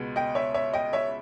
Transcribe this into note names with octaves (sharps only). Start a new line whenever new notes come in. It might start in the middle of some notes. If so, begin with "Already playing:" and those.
Already playing: C#2 B2 G#3 B3
D#5 G5
C#5 E5
C#5 E5
D#5 G5
C#5 E5